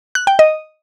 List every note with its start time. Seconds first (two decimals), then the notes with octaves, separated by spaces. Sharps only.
0.15 F#6
0.27 G5
0.39 D#5